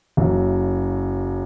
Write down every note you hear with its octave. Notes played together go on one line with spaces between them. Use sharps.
F#1 F#2 F#3